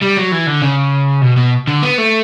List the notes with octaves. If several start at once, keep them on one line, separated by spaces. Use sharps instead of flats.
G3
F#3
E3
D3
C#3
B2
B2
D3
B3
A3